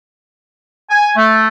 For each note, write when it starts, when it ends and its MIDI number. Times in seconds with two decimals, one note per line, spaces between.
0.90 1.11 80
1.16 1.48 57